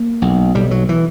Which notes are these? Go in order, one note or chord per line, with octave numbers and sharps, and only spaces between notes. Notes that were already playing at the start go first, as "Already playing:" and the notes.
Already playing: A#3
B1
B1 G3
F#3
E3